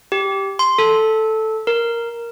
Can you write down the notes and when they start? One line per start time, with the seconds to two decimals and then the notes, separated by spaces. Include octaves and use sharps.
0.12 G4
0.59 C6
0.78 A4
1.67 A#4